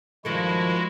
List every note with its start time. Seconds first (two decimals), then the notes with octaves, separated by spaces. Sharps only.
0.25 G2 D#3 F3 G#3 E4 F#4 A4